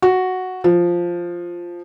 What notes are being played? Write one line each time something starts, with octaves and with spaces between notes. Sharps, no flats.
F#4
F3